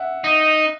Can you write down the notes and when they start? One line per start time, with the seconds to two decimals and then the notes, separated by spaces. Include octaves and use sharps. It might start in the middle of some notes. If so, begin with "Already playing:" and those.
Already playing: E5 F#5
0.24 D#4